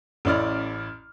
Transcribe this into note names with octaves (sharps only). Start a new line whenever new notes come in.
A1 C#4 E4 D5 F6